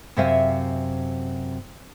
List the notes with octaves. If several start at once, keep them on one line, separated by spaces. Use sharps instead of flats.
F#2 C3 C5 E5 F5 G#5